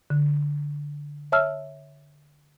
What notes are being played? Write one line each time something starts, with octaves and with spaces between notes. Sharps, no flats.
D3
C#5 E5 A5 E6 F6